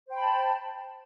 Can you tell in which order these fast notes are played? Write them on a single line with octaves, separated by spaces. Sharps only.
C5 G5 B5 A5